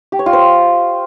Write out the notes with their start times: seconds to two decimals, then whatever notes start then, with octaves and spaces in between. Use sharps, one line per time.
0.12 G4
0.19 C#5
0.26 F4
0.33 C5